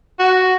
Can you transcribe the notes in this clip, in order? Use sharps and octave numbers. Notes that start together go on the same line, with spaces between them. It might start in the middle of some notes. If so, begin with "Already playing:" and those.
F#4